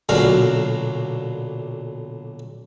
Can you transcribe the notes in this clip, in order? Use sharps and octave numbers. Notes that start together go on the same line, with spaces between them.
B1 A#2 D3 F#3 F#4 F5